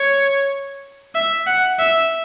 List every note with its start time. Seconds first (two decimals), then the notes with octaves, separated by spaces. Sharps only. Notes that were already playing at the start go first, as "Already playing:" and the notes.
Already playing: C#5
1.15 E5
1.46 F#5
1.79 E5